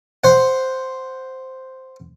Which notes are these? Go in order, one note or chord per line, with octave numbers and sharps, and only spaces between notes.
C5 F#5